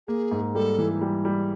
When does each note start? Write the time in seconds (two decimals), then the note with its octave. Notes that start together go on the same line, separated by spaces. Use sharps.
0.08 A#3 G#4
0.32 G#2
0.55 G3 A4
0.78 E3
1.02 G3
1.25 G3